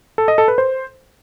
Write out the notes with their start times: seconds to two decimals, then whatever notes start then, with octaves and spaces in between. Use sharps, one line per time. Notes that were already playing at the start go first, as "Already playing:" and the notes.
0.18 A4
0.28 D#5
0.38 A4
0.48 B4
0.58 C5